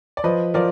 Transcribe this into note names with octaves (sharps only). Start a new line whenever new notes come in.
D5
F3 B4 D#5
F3 A#4 D5